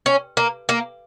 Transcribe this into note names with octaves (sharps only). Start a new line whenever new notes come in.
C#4
A#3
A#3